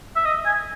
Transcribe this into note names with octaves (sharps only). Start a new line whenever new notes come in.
E5
D#5
G#5